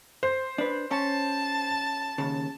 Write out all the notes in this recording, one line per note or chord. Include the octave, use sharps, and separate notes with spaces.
C5
D4 B4
C#4 A5
D#2 C#3